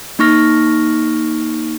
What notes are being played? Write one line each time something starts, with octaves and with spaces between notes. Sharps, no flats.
A#3 D#4 C#6 F6 A#6